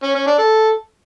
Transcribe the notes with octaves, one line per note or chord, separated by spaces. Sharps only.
C#4
C#4
D4
A4